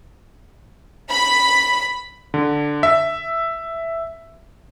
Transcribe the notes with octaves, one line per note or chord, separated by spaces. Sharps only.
B5
D3
E5